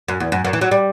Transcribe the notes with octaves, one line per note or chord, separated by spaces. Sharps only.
F#2
E2
F#2
F#2
E3
F#3
G3